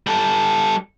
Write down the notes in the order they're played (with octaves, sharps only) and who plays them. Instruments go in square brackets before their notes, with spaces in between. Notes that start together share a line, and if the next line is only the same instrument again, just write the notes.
[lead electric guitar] G3 A4